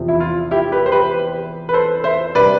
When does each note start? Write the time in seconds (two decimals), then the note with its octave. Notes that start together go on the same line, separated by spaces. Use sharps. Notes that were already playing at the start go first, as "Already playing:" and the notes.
Already playing: E2 C3 F3
0.08 E4
0.20 F4
0.51 E4 G4
0.72 G4 B4
0.86 C5
0.92 G4 B4
1.69 B4
1.73 A4 C5
2.04 C5 E5
2.35 C3 G3 D4 B4 D5